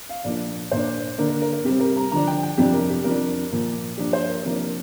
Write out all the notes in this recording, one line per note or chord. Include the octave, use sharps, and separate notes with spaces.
F5
A#2 F3 A#3 D4 D5
A#2 A#3 D4 C5
D3 A#3 D4 A#4
A#4
A#4
A#4
C3 G3 C4 G4
A#4
A#5
D3 F3 D4 A#5
G5
G5
F2 C3 F3 D4 G4
A#4
G4
F2 F3 D4 A#4
A#2 F3 A#3
G2 F3 A#3 D4 G4
C5
A#4
C3 F3 A#3 D4 A#4
A#4